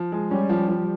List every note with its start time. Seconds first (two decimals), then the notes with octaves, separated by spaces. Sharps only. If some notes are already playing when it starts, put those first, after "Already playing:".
Already playing: F3
0.12 G#3
0.31 G3 C#4
0.49 F3
0.68 F3